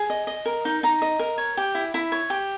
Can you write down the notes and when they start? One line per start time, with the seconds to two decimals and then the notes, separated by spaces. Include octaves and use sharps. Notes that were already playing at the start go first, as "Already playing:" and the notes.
Already playing: G#4
0.10 D#5
0.27 D#5
0.46 A#4
0.65 D#4
0.83 D#4 A#5
1.02 D#5
1.19 A#4
1.38 C#5
1.57 G4
1.75 E4
1.94 E4 B5
2.12 C#5
2.30 G4